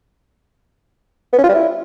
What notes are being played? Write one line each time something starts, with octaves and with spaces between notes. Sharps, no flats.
B3
C#4
F4
G3
E4